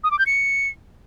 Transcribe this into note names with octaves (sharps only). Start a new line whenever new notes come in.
D#6
D6
G6
C#7